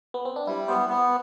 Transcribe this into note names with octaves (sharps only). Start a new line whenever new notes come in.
B3
C4
D4
G3 E4
B3 C5
B3